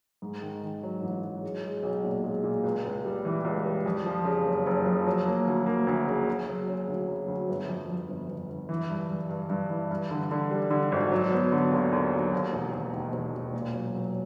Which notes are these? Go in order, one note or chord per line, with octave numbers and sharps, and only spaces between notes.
G#2
D#3
D#3
F#3
A1
F#3
G#3
G#3
B1
A#2
G#3
A#2
C#2
C#2
G3
E3
C#2
G3
F2
F3
C#3
F#1
F#1
F3
F#3
A#3
D2
A#3
D2
C#3
C#3
F#3
C#3
D2
F#3
D2
G1
F2
F2
G1
G1
G1
E3
G2
G2
G2
G2
E3
G2
D3
D3
G3
D3
G#1
F#3
B3
D3
D#2
D#2
F#3
D#2
E1
D#2
D#3
E1
E1
A#2
F#3
F#3